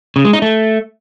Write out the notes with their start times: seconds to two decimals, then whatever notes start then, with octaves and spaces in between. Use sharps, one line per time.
0.16 C#3
0.25 G#3
0.33 D#4
0.42 A3